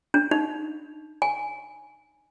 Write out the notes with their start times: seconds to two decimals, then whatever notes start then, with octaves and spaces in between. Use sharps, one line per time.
0.14 D4
0.31 D#4
1.22 G#5